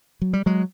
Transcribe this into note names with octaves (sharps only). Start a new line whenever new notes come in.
F#3
G3
F#3 G#3